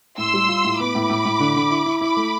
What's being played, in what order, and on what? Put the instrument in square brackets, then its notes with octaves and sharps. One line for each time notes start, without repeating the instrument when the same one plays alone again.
[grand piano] A2 [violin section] C6 E6
[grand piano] G3
F4
A2
[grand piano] B3 [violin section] B5 D6
[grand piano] A2
A2
A2
D3
D3
E4
E4
[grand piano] E4 [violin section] B5 D6
[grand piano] A3